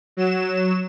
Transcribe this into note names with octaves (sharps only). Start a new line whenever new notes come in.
F#3 E7